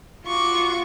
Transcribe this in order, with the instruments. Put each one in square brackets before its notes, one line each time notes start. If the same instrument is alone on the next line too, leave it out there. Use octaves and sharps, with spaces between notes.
[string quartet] F4 F#4 C#6 D6